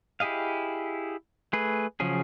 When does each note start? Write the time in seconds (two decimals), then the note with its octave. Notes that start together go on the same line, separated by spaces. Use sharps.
0.20 E4 G4 G#4 D#5 F5
1.53 A3 G#4 B4
2.00 C#3 F3 F#3 C#4 G#4